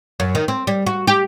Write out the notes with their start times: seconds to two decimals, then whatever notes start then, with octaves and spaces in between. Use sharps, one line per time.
0.20 F#2
0.35 D#3
0.48 C4
0.67 G3
0.87 F#4
1.07 G4